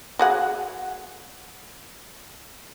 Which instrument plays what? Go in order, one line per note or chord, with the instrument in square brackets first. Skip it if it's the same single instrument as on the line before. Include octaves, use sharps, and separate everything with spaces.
[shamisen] F#4 G#4 F#5